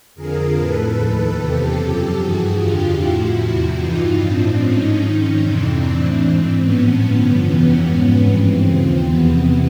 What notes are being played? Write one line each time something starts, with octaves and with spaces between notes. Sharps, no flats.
F2 D3 F3 G#4 A#4
A2 F3 A4 B4
D#2 D#3
E2 C3 F3 G4 A4
F#2 C#3 F3
G2 E3 F#4 G#4
F2 D3 F3 F4 G4
A2 F3 E4 F#4
E2 C3 F3
G2 E3 D#4 F4
A2 F3 C4 D4
G#2 F3 C#4 D#4
G#2 D#3
F2 C3 E3 C4 D4
E3
A2
G#2 E3 C4
A2 F3 B3 C#4
G2 D3 F3
F2 C3 E3
G#2 F3
G2 E3 C4
D#2 C#3 F3 C4
E2 C3 E3 B3